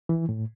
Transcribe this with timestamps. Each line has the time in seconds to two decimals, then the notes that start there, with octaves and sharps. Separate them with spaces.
0.09 E3
0.29 A2